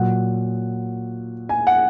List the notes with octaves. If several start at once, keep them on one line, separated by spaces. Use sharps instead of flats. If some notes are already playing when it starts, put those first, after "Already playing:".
Already playing: A#2 F#3 F#5
G#5
F#5